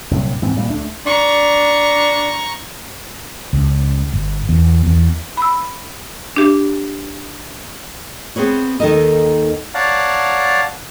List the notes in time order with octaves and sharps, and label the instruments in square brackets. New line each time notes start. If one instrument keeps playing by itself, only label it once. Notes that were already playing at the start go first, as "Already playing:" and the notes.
[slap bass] C2 G2 A#2 F#3
G#2 E3 C4
A#2 G3 A3 A#3
D2 A3 D4
[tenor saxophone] D4 [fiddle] A#5 C#6
[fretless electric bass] C#2
G1
E2
E2
[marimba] B5 E6
D4 G4
[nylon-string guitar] B3 C4 G#4 B4 C#5
D#2 D#3 D#4 A4 A#4 D#5
[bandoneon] C#5 D5 F5 F#5 A5 A#5